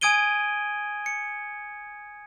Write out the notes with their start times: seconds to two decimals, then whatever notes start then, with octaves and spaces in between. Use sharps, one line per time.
0.01 G#5 D#6 G#6 D7 D#7 G7
1.06 C#7